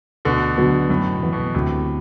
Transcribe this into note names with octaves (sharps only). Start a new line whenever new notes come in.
D2 B2 D3
B2 D3 F#3 B3 F#4
F#2 A2
B2
E3 B3
B2
D2 A2 C3